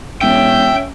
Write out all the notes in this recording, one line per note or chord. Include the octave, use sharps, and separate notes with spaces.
E1 C#4 E5 G5